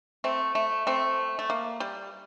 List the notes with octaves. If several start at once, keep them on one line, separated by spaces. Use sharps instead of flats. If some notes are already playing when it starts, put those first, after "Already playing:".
A3 C4
A3
A3 C4
A3
A#3
G3